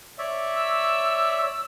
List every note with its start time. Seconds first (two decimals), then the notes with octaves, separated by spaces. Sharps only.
0.18 C#5 D5 E5
0.55 E6